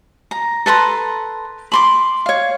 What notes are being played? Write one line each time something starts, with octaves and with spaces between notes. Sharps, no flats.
A#5
A4 B4 A#5 C6
B5 C6 D6
C#5 F5